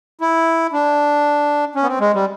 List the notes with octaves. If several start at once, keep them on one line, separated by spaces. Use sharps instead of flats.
E4
D4
C#4
B3
C4
G#3
G3